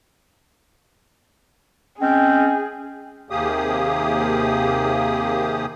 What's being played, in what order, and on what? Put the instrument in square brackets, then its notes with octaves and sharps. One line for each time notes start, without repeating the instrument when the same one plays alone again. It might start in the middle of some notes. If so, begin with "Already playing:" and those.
[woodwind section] G#3 C4 C#4 [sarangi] G#4 [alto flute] G5
[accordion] D#2 C3 A#3 G4 G#4 D#6